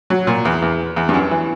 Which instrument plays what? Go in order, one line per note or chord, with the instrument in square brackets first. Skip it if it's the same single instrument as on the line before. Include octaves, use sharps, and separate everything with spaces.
[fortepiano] F#3
A#2
E2
E2
E2
G2
F#2
E3